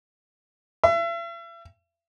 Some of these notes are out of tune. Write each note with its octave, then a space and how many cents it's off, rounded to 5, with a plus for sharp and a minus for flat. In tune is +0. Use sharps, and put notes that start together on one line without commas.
E5 +40